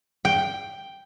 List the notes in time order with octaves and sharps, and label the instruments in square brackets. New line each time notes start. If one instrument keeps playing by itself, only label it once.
[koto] G5